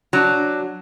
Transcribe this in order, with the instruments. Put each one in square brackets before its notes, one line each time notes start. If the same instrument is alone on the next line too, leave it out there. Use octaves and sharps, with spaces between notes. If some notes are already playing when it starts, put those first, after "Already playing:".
[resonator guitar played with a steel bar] F#3 D4